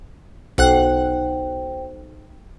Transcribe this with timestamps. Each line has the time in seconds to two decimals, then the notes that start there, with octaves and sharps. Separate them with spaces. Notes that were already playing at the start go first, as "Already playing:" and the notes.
0.58 B1 C5 F#5 G5 F#6